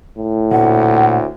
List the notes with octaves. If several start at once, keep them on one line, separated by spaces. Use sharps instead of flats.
A2
D2 A#2 A3 F#5